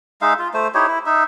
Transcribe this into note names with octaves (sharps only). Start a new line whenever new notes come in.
G#3 D#4 E5 F5
F4
A3 C5
D#4 E4 G4 C#5
E4
D#4 E5